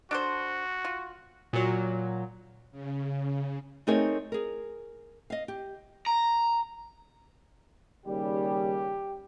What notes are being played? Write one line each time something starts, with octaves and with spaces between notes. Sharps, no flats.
D4 F#4 A4 C5
F4
A#2 F#3
C#3
A3 C4 D#4 G#4 A#4 C#5
G#4 A#4
D#5 F5
G4
A#5
D#2 C#3 G3 G4